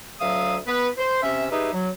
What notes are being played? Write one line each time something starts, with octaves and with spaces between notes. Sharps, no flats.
D2 F#3 E5 F5 D#6
B3 B4
C5
C3 C#4 E5
D#4 G4 G#4 B4 E5
F#3